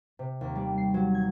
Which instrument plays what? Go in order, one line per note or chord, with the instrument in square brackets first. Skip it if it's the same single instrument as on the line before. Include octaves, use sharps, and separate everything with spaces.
[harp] C3
D#2
G3
C7
F#3
G#6